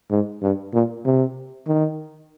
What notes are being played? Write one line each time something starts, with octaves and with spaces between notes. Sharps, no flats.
G#2
G2
A#2
C3
D#3